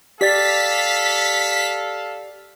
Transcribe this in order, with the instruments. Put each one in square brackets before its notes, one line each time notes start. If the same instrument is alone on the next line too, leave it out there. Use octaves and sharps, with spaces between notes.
[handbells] G4 D5 A6 [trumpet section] A4 F5 [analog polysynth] B6